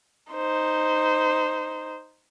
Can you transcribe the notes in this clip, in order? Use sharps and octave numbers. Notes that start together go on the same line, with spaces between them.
D#4 C5